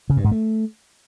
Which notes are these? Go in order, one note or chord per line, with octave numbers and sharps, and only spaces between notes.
C#3
G2
G#2
A3